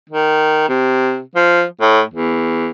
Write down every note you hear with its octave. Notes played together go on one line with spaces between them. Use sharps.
D#3
C3
F3
A2
E2